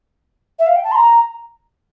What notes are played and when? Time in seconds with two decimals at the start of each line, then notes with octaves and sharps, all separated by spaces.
0.59 E5
0.66 F5
0.76 G5
0.84 A5
0.92 C6
0.95 A#5